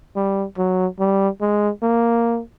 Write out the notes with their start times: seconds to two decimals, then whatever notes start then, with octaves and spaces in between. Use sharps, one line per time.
0.16 G3
0.58 F#3
1.00 G3
1.41 G#3
1.83 A#3